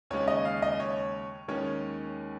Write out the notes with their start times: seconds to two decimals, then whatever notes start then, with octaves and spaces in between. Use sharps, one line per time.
0.10 D#2 C#3 G#3 C#4 C#5
0.28 D#5
0.45 F5
0.62 D#5
0.80 C#5
1.48 D#2 D#3 G#3 C#4 C#5